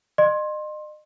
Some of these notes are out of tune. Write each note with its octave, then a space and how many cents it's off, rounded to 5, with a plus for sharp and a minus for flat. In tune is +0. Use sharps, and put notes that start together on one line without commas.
D#5 -35 C6 +20